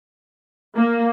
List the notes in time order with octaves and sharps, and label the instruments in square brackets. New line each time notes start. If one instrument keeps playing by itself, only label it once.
[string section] A#3